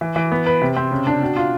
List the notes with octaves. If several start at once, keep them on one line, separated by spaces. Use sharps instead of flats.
E3
E3
B3
B4
C3
C4
C#3
D4
B2
F4